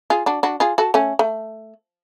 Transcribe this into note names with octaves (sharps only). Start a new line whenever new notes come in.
F4 G#4
D4 F#4
D4 F#4
F4 G#4
F#4 A4
A3 C#4
A3